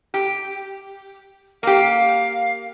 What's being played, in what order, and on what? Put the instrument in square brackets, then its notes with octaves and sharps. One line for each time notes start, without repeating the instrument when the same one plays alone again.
[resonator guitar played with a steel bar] G4
[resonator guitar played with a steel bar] A#3 G4 [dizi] F5